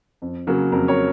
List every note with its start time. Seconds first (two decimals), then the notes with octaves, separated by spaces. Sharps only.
0.22 F2
0.47 C#3 F#3 A#3
0.72 F2 A#4
0.88 A#4 C#5